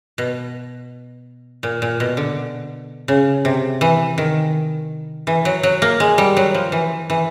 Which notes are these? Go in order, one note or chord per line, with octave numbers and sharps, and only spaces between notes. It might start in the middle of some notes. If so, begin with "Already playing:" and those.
B2
A#2
A#2
B2
D3
C#3
C3
E3
D#3
E3
F#3
F#3
A#3
G#3
G3
F#3
F3
E3
E3